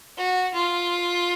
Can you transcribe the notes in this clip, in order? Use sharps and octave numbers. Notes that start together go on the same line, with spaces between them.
F#4
F4